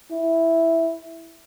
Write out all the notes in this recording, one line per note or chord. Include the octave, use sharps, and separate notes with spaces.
E4